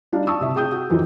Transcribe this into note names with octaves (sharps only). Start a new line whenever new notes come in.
G3 D4 D#4 F5
A5 C#6 D#6 E6
C3 E5 A5
G#4 G5 D#6 G6
F#4
F2 E3 F#3 D#4